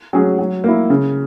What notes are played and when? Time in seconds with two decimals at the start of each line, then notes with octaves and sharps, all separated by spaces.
0.13 F#3 C#4 G#4
0.39 F#3
0.64 A#3 E4
0.90 C#3